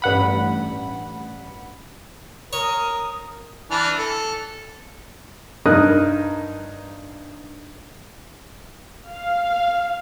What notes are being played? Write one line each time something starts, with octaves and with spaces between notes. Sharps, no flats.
A1 G2 F#5 B5
A#4 C#5 D#6
E3 D4 F6
A4
G2 D#4 A#4 D#6 F#6
F5